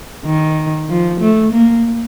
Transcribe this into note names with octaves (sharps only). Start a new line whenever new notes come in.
D#3
F3
A3
A#3